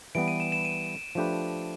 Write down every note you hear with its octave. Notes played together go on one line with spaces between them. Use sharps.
E3 G3 B3 D7
D#7
E7
E7
D#7
F3 A3 D4 G4 B4